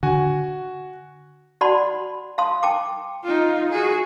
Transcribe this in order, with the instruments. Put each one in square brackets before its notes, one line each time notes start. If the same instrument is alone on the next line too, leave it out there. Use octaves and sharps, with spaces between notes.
[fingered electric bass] D3 [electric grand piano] F#4 G#5
[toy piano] F#4 D5 F#5 A5 B5 C6
F5 A5 C6 D#6
G5 A5 D6
[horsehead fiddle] D#4 F4
F#4 G#4